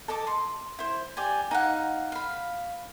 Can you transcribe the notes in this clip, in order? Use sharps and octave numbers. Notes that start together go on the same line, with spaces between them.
A4 D#5 A5 D6
C6
E4 C5
G4 D5 G#5
D#4 F5 F#5
F5 B5